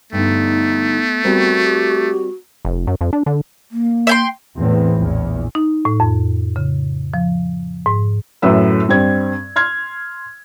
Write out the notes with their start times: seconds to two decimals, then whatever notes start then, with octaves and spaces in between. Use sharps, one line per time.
0.13 G2 D3 A3 B3 D#4
1.24 G3 B3 C4 F#4 A#4
1.63 G4
2.65 F1
2.87 F#2
3.01 F2
3.13 D4
3.26 D3
3.71 A#3
4.07 E5 G5 C6
4.58 E2 A2 E3 C4
4.97 A#1 E2
5.55 D#4
5.85 A2
6.00 F2
6.56 C#3
7.14 F3
7.86 G#2
8.42 F#2 A2 F#3 B4 E5 E6
8.89 G2 G3 C4 G#6
9.56 C6 F6 G#6